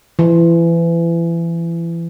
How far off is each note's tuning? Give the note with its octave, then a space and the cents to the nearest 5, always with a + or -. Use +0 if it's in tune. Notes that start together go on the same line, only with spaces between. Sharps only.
E3 +30